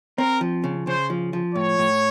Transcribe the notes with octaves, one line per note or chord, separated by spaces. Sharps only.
C4 A#4
F3
C#3
C#3 C5
F3
F3
A2 C#5
A2